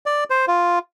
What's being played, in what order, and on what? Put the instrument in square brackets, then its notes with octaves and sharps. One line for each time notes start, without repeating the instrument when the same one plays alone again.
[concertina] D5
C5
F4